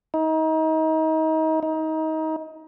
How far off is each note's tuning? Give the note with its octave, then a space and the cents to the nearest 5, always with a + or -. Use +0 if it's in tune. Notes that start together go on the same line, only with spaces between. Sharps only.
D#4 +30
D#4 +25